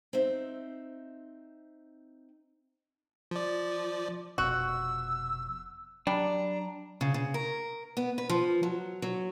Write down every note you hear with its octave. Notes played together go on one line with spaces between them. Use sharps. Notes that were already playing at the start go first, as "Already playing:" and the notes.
C4 D#4 E5
F3 D5
F1 F2 B2 F#4 E6
F#3 G3 D4 A#5
C#3
C#3
A#4
B3
B4
F3
F#3
F#3